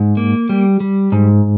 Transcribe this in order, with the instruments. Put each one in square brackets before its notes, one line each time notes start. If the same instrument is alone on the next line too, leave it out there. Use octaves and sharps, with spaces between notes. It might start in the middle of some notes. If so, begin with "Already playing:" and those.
Already playing: [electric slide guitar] G#2
A#3
G3
G3
G#2